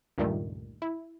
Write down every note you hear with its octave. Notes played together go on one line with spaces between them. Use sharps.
C#2 G2 A#2 D#3 G3 A3
E4